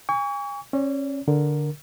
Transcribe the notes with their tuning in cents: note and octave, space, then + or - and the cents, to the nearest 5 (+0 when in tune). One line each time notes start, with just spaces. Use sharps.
G#5 -35 C#6 +35
C#4 -25 D5 -45
D3 +0 A#4 +0